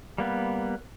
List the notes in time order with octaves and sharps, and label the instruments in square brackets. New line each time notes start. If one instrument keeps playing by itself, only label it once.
[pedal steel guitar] G3 A#3 B3